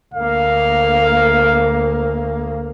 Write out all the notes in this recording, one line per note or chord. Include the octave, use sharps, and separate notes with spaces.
D2 A#3 F5